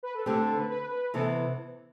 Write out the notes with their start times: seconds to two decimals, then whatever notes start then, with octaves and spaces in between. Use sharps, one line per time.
0.03 B4
0.14 A4
0.25 D3 A3 C4 G4
0.41 A4
0.56 B4
0.70 B4
0.91 B4
1.14 C3 E3 B3 A4